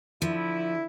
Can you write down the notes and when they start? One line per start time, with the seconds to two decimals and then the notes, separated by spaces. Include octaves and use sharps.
0.22 D3 F3 E4